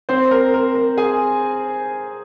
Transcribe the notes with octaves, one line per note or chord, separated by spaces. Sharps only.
C4 C5
A#4
A#4
A#4
G#4 G#5